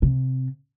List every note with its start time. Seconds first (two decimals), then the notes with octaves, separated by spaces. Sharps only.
0.02 C3